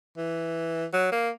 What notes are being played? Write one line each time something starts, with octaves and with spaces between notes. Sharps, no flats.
E3
F#3
A#3